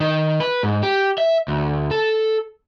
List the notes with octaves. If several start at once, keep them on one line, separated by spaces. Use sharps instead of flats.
D#3
B4
G#2
G4
E5
D2
A4